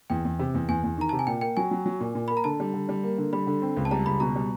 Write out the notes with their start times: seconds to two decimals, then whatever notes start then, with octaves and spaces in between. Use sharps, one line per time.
0.10 E2 G5
0.25 E2
0.39 C3
0.54 E2
0.69 E2 G#5
0.83 E2
0.97 D#3 A#5
1.09 C3 A5
1.19 G#5
1.27 A#2 G5
1.41 A#3 G5
1.57 F#3 G#5
1.71 F#3
1.86 F#3
2.00 A#2
2.15 A#2
2.28 A#3 B5
2.37 A#5
2.44 D3 A5
2.60 G3
2.74 D3
2.89 G3
3.03 A#3
3.18 D3
3.33 G3 B5
3.47 D3
3.62 C4
3.77 C#2
3.85 A5
3.91 G3 A#5
4.06 C#2 B5
4.20 B2 A#5
4.36 G3